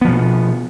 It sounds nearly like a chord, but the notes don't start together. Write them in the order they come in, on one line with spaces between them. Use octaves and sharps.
B3 F3 B2